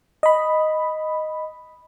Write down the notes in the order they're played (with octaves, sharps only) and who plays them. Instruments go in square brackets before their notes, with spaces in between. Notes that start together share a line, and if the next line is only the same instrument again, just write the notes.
[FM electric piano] D#5 B5